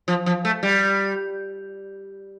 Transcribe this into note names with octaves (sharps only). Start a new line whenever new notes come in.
F3
F3
A3
G3